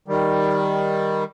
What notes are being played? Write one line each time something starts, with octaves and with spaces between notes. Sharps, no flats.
D#3 G3